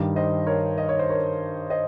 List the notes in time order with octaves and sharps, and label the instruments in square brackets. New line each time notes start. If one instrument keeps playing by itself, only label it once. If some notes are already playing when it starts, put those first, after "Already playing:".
Already playing: [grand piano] G2 D#3 G3
C5 D#5
A#4 C#5
D#5
C#5
C5
A#4 C#5
C5 D#5